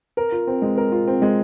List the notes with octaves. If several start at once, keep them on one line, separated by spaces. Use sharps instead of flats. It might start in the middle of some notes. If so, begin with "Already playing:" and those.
A#4
F4
C4
G#3
A#4
F4
C4
G#3